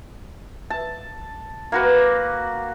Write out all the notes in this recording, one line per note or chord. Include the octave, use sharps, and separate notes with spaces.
A5
A#3 F#4 B4